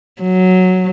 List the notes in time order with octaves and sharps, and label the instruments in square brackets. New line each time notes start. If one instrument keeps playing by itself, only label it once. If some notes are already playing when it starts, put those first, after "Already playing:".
[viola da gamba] F#3